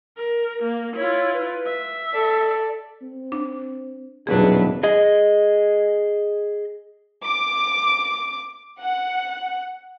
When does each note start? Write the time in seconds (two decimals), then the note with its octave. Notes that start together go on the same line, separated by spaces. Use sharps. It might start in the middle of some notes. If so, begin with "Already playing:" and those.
0.17 A#4
0.62 A#3
0.96 E4 F4 C#5
1.33 B4
1.66 E5
2.13 A4 D5
3.02 C4
3.32 D4
4.27 D#1 E2 B2 F#3 D4 G#4 B4
4.83 G#4 D#5
7.25 D6
8.81 F#5